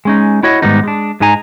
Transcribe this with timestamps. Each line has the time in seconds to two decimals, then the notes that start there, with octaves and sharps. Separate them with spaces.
0.05 G#3 C#4 D#4
0.43 E4 F#4 C#5 D#5
0.62 G#2 D#3 G3 B3 D#4
0.84 G#3 D4
1.20 G#2 G#3 D#4 G#5 A#5